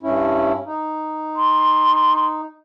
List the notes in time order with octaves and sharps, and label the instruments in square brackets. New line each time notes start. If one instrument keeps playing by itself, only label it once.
[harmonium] G2 C#4 E4
D#4
[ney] C6